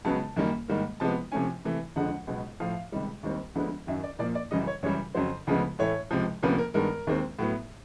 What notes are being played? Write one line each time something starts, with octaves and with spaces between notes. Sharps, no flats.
C#2 C#3 F#3 B3 A5
F#2 D#3 G3 A#3
G#2 D#3 G3 A#3
C3 F3 G#3 B3 A5
C3 F3 A3 C#4 G#5
C3 E3 A3
F2 D3 F3 G#3 F#5
C#2 B2 F#3 B3
A2 F3 A3 F5
C#2 C3 D#3 G3
D#2 D#3 G3 C4
D2 D3 F3 G#3 B3
F#2 D#3 F#3 E5
D5
A#2 F3 A#3 D5
D5
F#2 C#3 E3 G3 D#5
C#5
F#2 C#3 E3 G3 C#5
F2 C#3 F#3 C5
D2 C#3 F3 G#3 B3
A2 E3 A3 C#5
C#2 C3 F3
D2 C3 F3 A#3 C#4 B4
A#4
G2 D#3 G#3 B3 A#4
D#2 D#3 G#3 C4
A2 F#3 B3